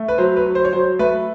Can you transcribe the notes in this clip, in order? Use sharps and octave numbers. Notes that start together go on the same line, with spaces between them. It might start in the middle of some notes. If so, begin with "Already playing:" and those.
Already playing: A3
B4
F#3 C5
B4
F#3
C5
C#5
F#3 C5
A3 B4